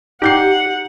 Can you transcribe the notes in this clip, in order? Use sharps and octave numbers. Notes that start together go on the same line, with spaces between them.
D#4 G4 F#5 G6 C7